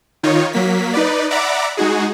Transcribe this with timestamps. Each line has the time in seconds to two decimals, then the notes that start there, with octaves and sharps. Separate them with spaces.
0.23 D#3 D#4 F4 C#5
0.53 F#3 A#3 B6
0.93 D#4 B4 D5
1.31 D5 E5 F#5 A#5 B5 D6
1.77 G#3 D#4 F#4 G#4